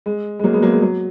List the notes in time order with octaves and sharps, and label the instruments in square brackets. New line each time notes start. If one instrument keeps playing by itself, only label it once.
[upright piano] G#3
G#3
F#3 A#3
G#3 B3
F#3 A#3
G#3
F#3